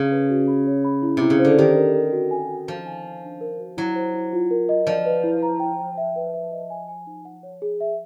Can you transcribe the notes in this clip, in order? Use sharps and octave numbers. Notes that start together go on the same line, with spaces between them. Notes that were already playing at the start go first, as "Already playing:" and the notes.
Already playing: C#3
B4
F#4
B5
C#5
B5
E4
C3 E4
C#3
C5
D3
D#3 G4
A#4
A#4
F#4
G#5
F#4
F3 C5
G#5
C5
D4
A#4
F#4
F#3 E4
C5
E4
F4
A#4
D#5
F3 D5
B4
E4
A#5
G5
G5
E5
B4
E5
D#5
G#5
G#5
D#4
F#5
C#5
G#4
E5